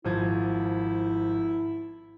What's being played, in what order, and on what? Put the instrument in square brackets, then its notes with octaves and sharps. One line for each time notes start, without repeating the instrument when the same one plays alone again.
[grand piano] G#1 F3 G#6 [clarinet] E4